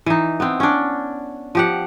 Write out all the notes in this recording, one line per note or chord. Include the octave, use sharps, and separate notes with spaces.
E3 D#4
B3 C4
C#4 D4
F3 G4 F#5